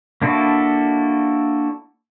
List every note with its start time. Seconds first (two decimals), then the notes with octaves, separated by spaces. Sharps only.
0.22 A#3 D4 E4 F#4 A4